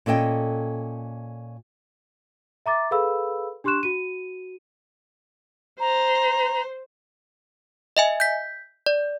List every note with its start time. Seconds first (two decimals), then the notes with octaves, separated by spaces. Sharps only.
0.06 A#2 C#4 A4 D#5 G5
2.66 E5 A#5 D6 A6
2.91 G#4 A4 B4 F5 B5 E6
3.64 D4 G4 C6 C#6 F#6 E7
3.83 F#4 D#7
5.80 C5 A#5
7.97 D#5 E5 G#5
8.20 G6 B6
8.86 D5